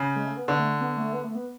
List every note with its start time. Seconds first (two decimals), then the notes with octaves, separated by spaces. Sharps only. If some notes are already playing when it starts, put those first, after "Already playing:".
Already playing: C#3
0.16 G#3
0.26 A3
0.37 B3
0.48 D3 B3
0.59 A3
0.81 B3
0.97 A3
1.13 B3
1.24 A3
1.35 B3